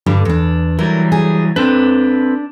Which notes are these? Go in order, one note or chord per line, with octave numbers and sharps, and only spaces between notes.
G2 D3 G3
E2 D4
E3 F#3 G3 A#4
G#4
C4 D4 A4 B4